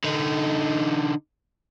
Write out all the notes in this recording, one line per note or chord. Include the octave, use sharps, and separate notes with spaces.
D3 D#4